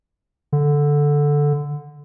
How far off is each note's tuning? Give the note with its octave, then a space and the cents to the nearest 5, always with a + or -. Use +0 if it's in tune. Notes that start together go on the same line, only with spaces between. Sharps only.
D3 -5